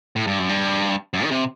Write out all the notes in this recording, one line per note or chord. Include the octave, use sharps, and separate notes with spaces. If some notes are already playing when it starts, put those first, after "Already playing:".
A2
G2
F#2
G2
F#2
D#3
C3